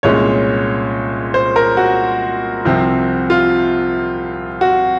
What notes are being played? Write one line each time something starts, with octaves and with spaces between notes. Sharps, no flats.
C2 A#2 G#3 C#4 C#5
C5
A#4
F#4
C2 C3 F3 C4
F4
F#4